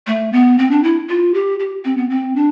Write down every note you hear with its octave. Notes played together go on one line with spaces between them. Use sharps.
A3
B3
C4
D4
E4
F4
G4
G4
C4
B3
C4
D4